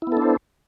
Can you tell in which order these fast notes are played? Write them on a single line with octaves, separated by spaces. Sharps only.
E4 B3 A4 D4 C5